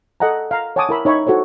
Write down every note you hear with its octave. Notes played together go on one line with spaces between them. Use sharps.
A4 D#5 F#5 G#5 A#5
F5 A#5
C#5 F#5 G#5 A5 D6 D#6
E4 A#4 B5 E6
D#4 C#5 E5 B5 C#6
E4 F#4 A4 C5 C#5